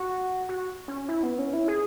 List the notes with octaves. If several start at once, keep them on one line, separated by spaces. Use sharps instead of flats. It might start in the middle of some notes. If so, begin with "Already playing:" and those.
Already playing: F#4
F#4
C#4
E4
B3
C#4
E4
G#4